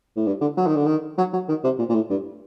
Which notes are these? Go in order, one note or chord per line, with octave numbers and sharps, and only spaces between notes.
A2
G2
D3
F#3
D#3
D3
D#3
F#3
F#3
D#3
C3
A#2
A#2
A2
G2